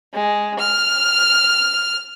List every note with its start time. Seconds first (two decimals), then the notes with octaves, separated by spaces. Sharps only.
0.13 G#3
0.59 F6